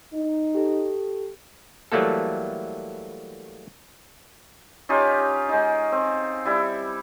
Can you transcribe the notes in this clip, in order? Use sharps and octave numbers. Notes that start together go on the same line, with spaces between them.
D#4
G4 A4
E3 F#3 G3 A3 A#3 A4
C#4 D#4 F4 G4
G#3 D#4
C4
G3 E4